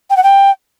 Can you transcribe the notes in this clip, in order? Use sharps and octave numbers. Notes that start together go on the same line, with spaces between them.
G5
F#5
G5